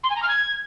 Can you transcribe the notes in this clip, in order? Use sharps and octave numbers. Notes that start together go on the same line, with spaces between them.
C6
G#5
A#5
F6
G#6